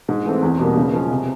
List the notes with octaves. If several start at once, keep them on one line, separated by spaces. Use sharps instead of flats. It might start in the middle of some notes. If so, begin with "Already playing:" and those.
G#2
E3 A3 C4
E2
B2 G3 A#3
C#3
F3 G#3 C#4
C3